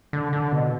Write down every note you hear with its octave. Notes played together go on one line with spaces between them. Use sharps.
D3
D3
B2